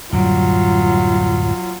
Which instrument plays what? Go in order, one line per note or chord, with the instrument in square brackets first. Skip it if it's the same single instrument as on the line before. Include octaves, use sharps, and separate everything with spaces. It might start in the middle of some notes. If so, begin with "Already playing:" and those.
[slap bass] D1 F#2 G3 [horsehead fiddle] F#3 F4